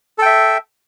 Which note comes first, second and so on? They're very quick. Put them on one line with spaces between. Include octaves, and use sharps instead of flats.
A4 G5 E5